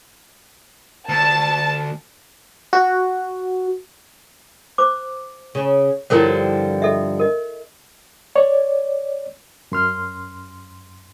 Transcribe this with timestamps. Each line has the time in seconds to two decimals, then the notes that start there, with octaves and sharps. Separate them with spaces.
1.09 D2 A5
2.73 F#4
4.78 C5 D6
5.55 C#3
6.10 G2 D3 F3 E4 A#4 C#5
6.82 A4 D#5 E5
7.20 A#4 D#5
8.36 C#5 D5
9.72 F#2 C6 F6